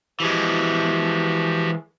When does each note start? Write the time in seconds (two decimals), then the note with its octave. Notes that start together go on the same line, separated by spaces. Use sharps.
0.20 E3 F3 G#3 F#4 G4